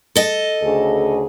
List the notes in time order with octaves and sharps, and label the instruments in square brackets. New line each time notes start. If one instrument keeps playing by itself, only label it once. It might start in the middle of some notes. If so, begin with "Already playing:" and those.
[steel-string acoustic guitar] A4 D#5
[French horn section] D2 C#3 G#4